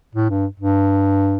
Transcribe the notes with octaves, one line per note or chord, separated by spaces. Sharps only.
A2
G2
G2